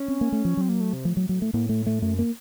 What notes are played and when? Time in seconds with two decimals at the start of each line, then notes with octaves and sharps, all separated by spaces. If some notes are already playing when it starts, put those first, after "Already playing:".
Already playing: C#4
0.08 C4
0.21 A#3
0.32 A3
0.45 F3
0.57 F#3 C4
0.69 A#3
0.81 A3
0.93 C3
1.05 A2 F3
1.17 F#3
1.29 F#3
1.42 A3
1.54 A2 A#3
1.69 A3
1.86 A3
2.02 F#2 A3
2.19 A#3